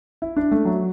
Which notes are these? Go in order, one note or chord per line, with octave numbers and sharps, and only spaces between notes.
E4
D4
A3
F#3